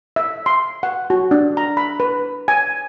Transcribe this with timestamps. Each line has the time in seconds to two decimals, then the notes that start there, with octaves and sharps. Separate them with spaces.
0.16 E5
0.46 C6
0.83 F#5
1.10 F#4
1.31 D4
1.57 A#5
1.77 B5
2.00 B4
2.48 G#5